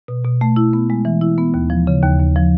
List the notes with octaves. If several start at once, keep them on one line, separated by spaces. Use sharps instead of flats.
B2
B2
A3
E4
B3
G#3
E3
E4
B3
D#2
F3
C#3
D#2
D#2
F3